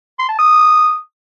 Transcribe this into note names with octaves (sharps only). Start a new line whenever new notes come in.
C6
A5
D#6